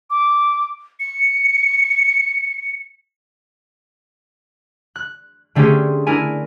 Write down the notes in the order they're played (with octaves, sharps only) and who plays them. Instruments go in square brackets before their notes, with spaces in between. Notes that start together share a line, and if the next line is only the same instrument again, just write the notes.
[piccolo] D6
C#7
[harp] F#6
D3 A3 C4 C#4 G4 G#4
D4 E4 A#4 G#5